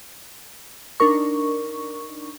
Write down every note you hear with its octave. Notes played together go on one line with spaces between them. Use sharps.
D4 D#4 A#4 C#6